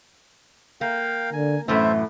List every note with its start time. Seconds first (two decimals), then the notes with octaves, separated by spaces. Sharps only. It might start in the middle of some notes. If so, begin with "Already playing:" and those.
0.81 A#3 F5 G5
1.33 D3 G#5
1.68 F#2 A2 E3 A3 C5 E5 A5